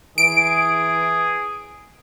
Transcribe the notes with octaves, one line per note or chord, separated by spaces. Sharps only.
E3 G#4 D7